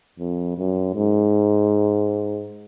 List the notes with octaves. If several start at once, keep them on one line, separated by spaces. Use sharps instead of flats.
F2
F#2
G#2